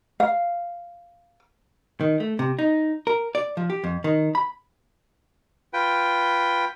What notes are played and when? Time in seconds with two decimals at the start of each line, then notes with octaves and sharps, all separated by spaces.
0.20 F5
2.01 D#3
2.20 A3
2.39 C3
2.59 D#4
3.07 A#4
3.35 D5
3.57 F3
3.70 G4
3.84 F2
4.04 D#3
4.35 B5
5.73 F4 B4 G5